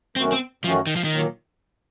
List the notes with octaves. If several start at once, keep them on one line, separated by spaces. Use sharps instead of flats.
F#2 D#3 A3 C4 C#4 F#4
C4
F#2 D#3 F3 A3 C#4 F#4
D#3
F3
D#3
A#2 F#3 A#3